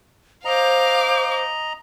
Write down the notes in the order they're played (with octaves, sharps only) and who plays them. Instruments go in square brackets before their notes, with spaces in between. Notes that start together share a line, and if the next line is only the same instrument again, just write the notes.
[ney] C5 [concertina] D#5 A#5 [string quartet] F5 D6